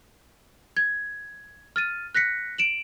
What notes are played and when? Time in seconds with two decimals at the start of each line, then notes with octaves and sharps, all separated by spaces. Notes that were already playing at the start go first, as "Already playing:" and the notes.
0.77 G#6
1.76 F6 A6 D#7
2.15 F#6 A#6 B6 C#7
2.58 D7 E7 F#7